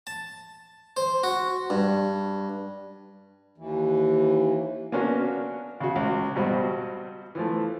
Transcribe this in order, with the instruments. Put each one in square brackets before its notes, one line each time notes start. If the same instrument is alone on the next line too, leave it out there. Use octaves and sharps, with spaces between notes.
[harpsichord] A5
C5
F#4
G2
[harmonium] D#2 E3
[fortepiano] A#3 B3 C#4 D4 F#4
C#3 F#4
C#2
G2 B2 C4 F#4
E3 F3 A3